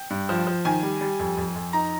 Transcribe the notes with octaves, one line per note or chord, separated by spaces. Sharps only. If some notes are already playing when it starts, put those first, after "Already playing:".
Already playing: G5
G2
F3
F3
D#3 G#5
G3
G3
F2
F2
F2
D#4 A#5